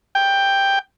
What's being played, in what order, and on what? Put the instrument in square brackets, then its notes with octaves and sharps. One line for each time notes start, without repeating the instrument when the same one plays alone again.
[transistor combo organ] G5